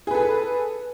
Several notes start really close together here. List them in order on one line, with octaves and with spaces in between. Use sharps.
G#4 B4 A4